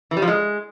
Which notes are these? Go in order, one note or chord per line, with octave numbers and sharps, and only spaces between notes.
E3
G3
F3
G#3